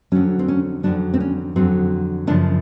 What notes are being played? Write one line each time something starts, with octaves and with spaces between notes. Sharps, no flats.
F2 D3 F#3 C#4
C4
C#4
F2 D3 F#3 D4
C4
C#4
F2 D3 F#3 C4
F#2 C#3 F3 D4